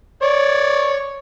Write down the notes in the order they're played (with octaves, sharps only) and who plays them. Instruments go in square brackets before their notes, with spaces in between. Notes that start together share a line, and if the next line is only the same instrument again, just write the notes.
[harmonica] C#5 D5